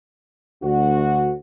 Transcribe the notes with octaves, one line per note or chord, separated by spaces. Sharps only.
D2 F#4